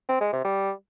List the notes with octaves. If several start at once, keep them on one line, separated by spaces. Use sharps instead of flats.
C4
G#3
C3
G3